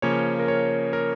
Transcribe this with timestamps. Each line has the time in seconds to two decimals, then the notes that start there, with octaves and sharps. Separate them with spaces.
0.02 C#3 F3 A#3 C#4 C#5
0.40 A#4
0.48 C#5
0.93 A#4